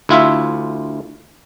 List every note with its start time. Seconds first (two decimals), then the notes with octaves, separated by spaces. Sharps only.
0.09 D2 E4 F4 E5